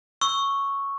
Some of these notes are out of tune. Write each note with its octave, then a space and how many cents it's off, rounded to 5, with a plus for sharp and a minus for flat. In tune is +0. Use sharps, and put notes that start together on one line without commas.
C#6 +0 E6 +0